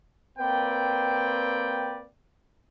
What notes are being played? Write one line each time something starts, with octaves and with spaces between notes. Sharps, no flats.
A#3 C4 B4 D5 G5